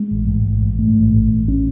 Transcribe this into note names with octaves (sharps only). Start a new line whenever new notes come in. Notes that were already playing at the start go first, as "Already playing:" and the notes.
Already playing: G#3
A1
G#2
A1
G#2
G#2 A3
A1
A1
A1
C#4